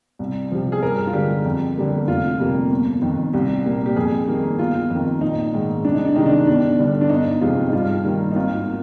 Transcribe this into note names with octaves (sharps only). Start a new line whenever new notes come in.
C2
C3 F3
G#4
G2 A#4
F4
D3 G#3 G4
F2
D3 G3 A#3
F1 F4
F2 C3 G3 A#3
G1
F2 D#3
C2 G4
A#2 G3 A#3
G4
F2 G#4
D#3 G3 A#3
G1 F4
F2 D#3 A#3
A#1 D#4
G#2 D#3
C2 D4
D#4
D4
C3 D#3 G#3 D#4
D4
G1 D4
G2 D3
D4
G1 D#4
F2 C3 F3 G#3 F4
D#4
G2 F4
D#3 G3 A#3
D#4
G#1 F4
A#3